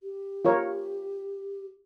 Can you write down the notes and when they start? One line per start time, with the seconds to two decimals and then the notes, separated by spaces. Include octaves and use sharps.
0.03 G4
0.45 F4 A#4 C#5